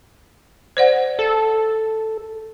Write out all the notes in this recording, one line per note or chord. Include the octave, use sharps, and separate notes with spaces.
C5 D5 F#5
A4